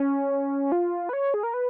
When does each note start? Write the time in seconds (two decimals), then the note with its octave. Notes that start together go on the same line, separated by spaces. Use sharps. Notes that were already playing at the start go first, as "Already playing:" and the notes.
Already playing: C#4
0.72 F4
1.09 B4
1.13 C#5
1.34 G#4
1.43 A#4
1.54 B4